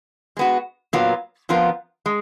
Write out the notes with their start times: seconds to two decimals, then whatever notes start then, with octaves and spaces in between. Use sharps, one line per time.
0.37 G#3 B3 F#4
0.93 A#2 F#3 B3 F4 A#4
1.49 F2 F3 B3 F4 A#4
2.06 G#3